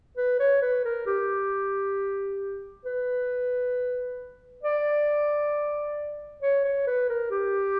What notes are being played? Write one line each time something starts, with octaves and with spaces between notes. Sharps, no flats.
B4
C#5
B4
A#4
G4
B4
D5
C#5
C#5
B4
A#4
G4